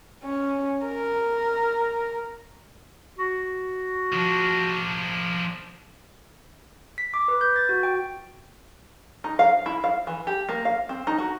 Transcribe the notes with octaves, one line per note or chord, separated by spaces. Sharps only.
C#4
A#4
F#4
F3 D4
B6
D6
B4
G6
A6
F#4
G5
D#4
F5
E4
F5
E3
G4
A#3
F5
C4
D#4
F#4